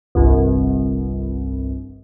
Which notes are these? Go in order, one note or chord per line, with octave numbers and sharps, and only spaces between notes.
G1 C2